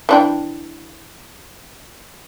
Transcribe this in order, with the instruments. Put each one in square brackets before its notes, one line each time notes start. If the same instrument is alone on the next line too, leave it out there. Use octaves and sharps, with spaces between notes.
[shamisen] E3 D4 G5